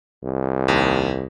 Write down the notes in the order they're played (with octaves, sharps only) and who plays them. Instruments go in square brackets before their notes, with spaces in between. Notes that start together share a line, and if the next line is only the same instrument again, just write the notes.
[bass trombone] C2
[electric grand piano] D#2